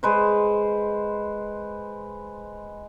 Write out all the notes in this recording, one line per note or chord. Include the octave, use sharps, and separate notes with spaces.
G#3 B4 C5